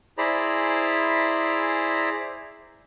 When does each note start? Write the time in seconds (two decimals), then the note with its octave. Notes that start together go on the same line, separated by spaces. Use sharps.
0.18 E4 G#4 C5 D5 A#5 B5